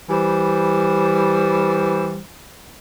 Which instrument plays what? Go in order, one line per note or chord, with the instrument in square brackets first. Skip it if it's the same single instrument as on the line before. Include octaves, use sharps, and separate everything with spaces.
[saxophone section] E3 G3 C5